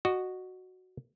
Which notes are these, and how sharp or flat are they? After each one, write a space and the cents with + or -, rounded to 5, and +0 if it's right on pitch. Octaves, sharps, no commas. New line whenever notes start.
F#4 +0 D#5 -30